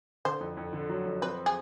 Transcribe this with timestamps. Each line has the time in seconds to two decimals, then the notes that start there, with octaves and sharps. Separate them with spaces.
0.25 D3 C5
0.40 F2
0.57 F2
0.73 D3
0.89 F#3
1.06 F2
1.22 C4 B4
1.46 G#4